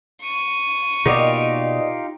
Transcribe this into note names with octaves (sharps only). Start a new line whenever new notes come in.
C#6 D#7
B2 A#3 D#4 F4 G4 D5 D#5